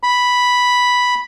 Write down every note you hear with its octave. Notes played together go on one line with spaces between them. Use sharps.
B5